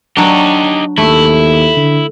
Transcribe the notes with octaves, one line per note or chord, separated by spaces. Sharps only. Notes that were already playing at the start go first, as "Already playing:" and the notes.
F#3 D4 D#4 G4
D#2 A3 E4
D3